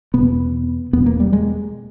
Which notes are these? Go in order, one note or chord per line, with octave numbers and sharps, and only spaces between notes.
E2 B2 B3
E2 B2 B3
A#3
G3
G#3